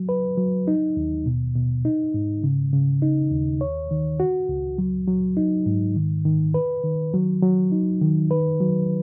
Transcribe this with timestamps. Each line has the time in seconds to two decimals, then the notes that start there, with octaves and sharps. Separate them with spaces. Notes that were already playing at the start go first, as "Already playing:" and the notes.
Already playing: F#3
0.09 B4
0.38 F#3
0.68 D#4
0.97 D#2
1.26 B2
1.55 B2
1.85 D#4
2.14 G#2
2.43 C#3
2.73 C#3
3.02 D#4
3.32 D#2
3.61 C#5
3.91 D#3
4.20 F#4
4.49 C#2
4.78 F#3
5.08 F#3
5.37 D#4
5.66 G#2
5.96 D#3
6.25 D#3
6.54 B4
6.84 D#3
7.13 F#3
7.43 F#3
7.72 D#4
8.02 D#3
8.31 B4
8.60 F#3